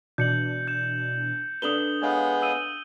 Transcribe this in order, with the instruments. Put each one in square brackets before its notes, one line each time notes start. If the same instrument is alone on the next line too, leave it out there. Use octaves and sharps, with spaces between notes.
[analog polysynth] B2 E3 D4 [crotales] G6 C#7 F#7
[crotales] G6 E7
[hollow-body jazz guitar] D4 A4 B4 [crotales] D#6 F#7 G7
[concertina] G#3 B3 G#4 [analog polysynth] C#5 F5 G5
[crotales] E6 D#7